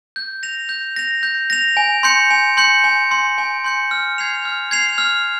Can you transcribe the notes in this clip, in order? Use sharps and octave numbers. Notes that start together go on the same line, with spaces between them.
G6
A#6 F7
G6
A#6 F7
G6
A#6 F7
G#5
C6 G6 C#7
G#5
C6 G6 C#7
G#5
C6 G6 C#7
G#5
C6 G6 C#7
F6
G#6 C7 F7
F6
G#6 C7 F7
F6